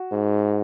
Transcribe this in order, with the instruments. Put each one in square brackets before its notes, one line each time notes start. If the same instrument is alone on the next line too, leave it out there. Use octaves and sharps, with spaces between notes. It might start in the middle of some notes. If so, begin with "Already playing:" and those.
Already playing: [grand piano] F#4
[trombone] G#2